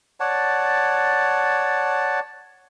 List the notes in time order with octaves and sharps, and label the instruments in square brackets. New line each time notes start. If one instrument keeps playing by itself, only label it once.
[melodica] C#5 D5 F#5 A5